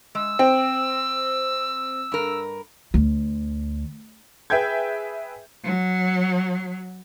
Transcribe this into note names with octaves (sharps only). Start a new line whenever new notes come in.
G#3 E6
C4 G5
G2 A#4
D2
G#4 B4 E5 G5 G6 G#6
F#3